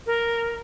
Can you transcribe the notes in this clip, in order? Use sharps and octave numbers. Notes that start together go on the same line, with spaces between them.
A#4